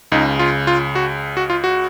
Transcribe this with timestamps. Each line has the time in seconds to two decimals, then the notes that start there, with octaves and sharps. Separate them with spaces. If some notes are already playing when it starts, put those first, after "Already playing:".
0.12 C#2 C#3 D#4
0.39 F4
0.67 F4
0.95 F#4
1.37 F#4
1.50 F4
1.64 F#4